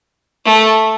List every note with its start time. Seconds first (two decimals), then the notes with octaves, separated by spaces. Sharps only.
0.45 A3